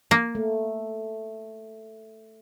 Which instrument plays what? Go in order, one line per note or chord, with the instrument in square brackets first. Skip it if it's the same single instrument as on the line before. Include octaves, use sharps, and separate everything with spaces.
[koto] A#3
[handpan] A3